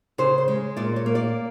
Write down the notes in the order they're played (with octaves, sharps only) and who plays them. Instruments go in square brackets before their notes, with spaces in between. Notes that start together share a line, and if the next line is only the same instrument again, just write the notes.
[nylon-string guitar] C#3 C5
C5
G#3
A#2 D5
C#5
A#3
D5